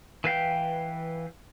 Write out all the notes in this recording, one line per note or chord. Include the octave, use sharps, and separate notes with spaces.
E3 B4 F5 G5